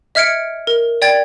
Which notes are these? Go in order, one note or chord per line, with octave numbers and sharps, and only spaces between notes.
D#5 E5 F6 G#6 C#7 D7
A#4
D5 G5 G#6 A6